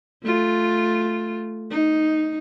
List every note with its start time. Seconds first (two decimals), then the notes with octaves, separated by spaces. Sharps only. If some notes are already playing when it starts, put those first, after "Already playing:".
0.23 A3 F4
1.71 D#4